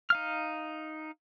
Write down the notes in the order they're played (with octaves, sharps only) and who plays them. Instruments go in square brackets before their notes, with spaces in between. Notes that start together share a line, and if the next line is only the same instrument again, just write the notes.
[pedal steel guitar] D#4 F5 F6